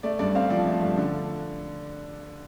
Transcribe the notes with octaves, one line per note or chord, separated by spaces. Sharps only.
A3 D5
G2 D5
C4 F5
F3 D5
A3
G2
D3